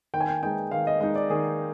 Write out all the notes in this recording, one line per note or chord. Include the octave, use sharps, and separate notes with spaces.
D#3 G5
G#5
G5
G#3 D#4 G5
D#3 F5
D#5
G#3 D#4 D#5
D5
D#3 G#4